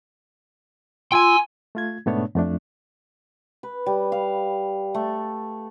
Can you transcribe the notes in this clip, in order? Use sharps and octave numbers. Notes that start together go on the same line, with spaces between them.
F4 G5 G#5 C6 E6
A3 F4 G#6
G#2 B2 A3 B3 D4 C#5
F2 A3 D4
B4
G3
F5
A3